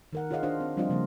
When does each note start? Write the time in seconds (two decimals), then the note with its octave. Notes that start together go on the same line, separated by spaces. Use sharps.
0.13 D#3 A#4 F#5
0.31 F4 G#4 C#5 D#5 F5 F#5
0.43 D4 F4 C5 F5
0.60 C4
0.77 F3 G3 C4 D4 F4 D#5
0.90 C#3 F3 G3 A#3 C4